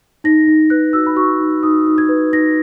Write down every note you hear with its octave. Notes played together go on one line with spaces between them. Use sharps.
D#4 A#6
D#4
B4 F#6
F#4 E6
B5
F#4 C#6
D#4
D#4 D#6
D#4
G#6
B4
D#4 A#6